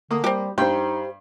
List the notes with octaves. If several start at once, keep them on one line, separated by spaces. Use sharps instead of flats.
D3 A#3 D#6
G3 C4 G4
G2 D#4 G4 C5 G5